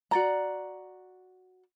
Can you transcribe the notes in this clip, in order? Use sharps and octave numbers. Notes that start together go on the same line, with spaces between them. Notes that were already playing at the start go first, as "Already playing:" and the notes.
F#4 D5 A#5